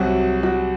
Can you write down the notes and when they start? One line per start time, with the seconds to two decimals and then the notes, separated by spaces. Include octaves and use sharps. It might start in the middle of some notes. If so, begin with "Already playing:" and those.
Already playing: C2 C3 F#3 F#4
0.43 F#4